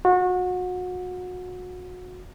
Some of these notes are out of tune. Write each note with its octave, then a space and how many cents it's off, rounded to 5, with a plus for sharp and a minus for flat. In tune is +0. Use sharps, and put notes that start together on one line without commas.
F#4 -30